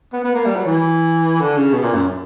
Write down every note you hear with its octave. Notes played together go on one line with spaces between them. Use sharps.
B3
B3
A#3
G3
F#3
E3
D3
C#3
B2
A#2
F#2